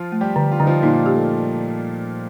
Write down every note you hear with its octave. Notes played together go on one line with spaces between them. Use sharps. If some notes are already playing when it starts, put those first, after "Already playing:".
Already playing: F3 F4
A3
G3 G4
D3
F4
D3 D#4
F3 F4
A#2 A#3 D#4
G4
A3